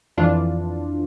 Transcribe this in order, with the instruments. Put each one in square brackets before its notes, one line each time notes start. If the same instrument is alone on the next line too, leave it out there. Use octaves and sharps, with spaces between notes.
[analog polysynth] F2 E3 D4 F4